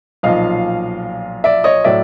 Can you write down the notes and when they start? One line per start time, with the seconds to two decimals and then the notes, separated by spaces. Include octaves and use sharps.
0.23 B1 A#2 F3 D#5 F5
1.44 D5 E5
1.64 C#5 D#5
1.84 A2 F#3 D5 E5